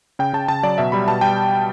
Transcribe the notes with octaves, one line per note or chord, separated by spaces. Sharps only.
C#3 G5
C#3 A5
C#3 A5
F#3 D5
B2 E5
G3 B5
B2 A5
G3 G5